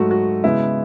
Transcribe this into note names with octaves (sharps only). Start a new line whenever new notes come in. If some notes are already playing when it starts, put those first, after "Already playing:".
Already playing: G#2 F#3 A3 F#4
F#4
C#3 G#3 B3 E4